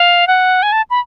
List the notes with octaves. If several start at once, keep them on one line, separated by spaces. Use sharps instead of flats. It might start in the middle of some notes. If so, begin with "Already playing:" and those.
Already playing: F5
F#5
G#5
A5
B5